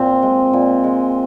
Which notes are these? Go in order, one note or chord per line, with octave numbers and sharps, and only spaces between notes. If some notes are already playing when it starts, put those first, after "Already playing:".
Already playing: A#2 C4
G#3
A#2
G#3